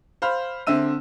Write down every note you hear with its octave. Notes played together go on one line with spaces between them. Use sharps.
C5 F5 B5 F6
D3 C4 E5 E6 D#7